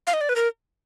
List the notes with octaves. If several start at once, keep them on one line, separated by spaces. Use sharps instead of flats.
F5
D#5
D5
B4
A#4